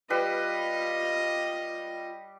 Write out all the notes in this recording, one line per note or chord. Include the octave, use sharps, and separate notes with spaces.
G3 F4 B4 D#5